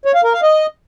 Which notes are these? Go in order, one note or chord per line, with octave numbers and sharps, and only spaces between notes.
C#5
F5
A#4
F5
D#5